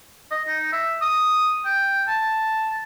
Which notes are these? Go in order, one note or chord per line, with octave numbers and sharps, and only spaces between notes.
D#5
D#4
E5
D#6
G5
A5